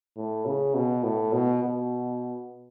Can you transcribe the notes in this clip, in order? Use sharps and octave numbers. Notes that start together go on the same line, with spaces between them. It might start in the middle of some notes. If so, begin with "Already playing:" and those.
A2
C#3
B2
A2
B2
B2